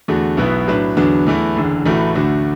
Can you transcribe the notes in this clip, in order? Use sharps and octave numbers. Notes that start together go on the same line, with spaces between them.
E2 D3 A3 F#4
B1 B2 B3 E4 B4
A2 F#3 D4 B4
E2 D3 F#3 B3 D4
E2 E3 A3 E4
F#1 E2 D3
A1 A2 E3 A3 F#4
D2 D3 A3 D4 F#4